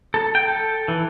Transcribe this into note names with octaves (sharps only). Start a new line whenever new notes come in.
A4
G5
A4
E3